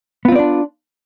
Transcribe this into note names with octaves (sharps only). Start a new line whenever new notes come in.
B3 C4 D4 F4 D5